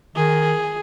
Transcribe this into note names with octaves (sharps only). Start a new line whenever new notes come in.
D#3 G#4